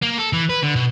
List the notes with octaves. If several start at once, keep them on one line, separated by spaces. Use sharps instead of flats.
A#3
A4
E3
B4
D3
B2